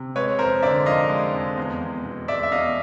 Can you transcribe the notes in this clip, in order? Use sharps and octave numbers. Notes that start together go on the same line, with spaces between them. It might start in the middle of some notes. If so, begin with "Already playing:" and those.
Already playing: C3
G#3 B4 C#5
F2 A#4 C5
D3 D5 E5
F3 D#5 F5
G#3
F2
E2
E2
B2
G#3 D5 E5
E5
E2 D#5 F5